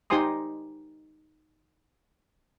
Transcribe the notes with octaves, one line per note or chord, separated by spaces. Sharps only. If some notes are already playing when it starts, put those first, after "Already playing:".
D#4 G4 C5 G#5 C6 D#6